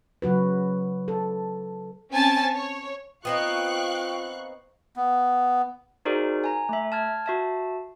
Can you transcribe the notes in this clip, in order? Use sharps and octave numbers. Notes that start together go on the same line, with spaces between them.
C#3 F#3 F#4 B4
A4
C4 C#4 G#5 A5 A6
C#5
B3 C4 D#4 F4 F5 G5 C#6 F#6
B3
D#4 F#4 G#4 A#4 C5 D5
G#5 A#5
A3 E5
A5 F6 G#6
F#4 E5 A5